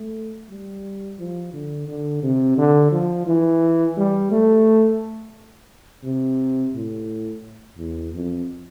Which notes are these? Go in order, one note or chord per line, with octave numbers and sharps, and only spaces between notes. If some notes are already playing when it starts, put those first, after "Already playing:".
Already playing: A3
G3
F3
D3
D3
C3
D3
F3
E3
G3
A3
C3
A2
E2
F2